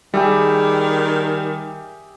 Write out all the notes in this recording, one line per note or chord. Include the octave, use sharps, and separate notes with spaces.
D#3 G3 G4 G#4 E5